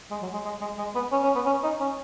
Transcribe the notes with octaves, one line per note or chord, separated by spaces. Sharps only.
G#3
F#3
G#3
G#3
G#3
G#3
B3
C#4
C#4
B3
C#4
D#4
C#4